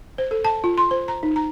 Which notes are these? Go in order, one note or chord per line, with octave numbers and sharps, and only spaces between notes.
C5
A4
A5
F4
C6
C5
A#5
D#4
A#5